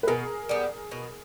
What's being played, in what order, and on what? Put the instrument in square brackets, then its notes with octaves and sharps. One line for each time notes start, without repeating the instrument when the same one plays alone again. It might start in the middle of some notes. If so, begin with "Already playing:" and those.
[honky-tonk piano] B4
[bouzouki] B2 [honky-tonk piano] G#4 A#4
[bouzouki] G3 B3
B2